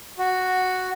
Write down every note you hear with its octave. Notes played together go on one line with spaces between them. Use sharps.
F#4